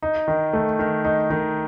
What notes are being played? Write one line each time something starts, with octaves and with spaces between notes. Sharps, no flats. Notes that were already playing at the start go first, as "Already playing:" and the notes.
D#4
D#3
A3
D#3
D#4
D#3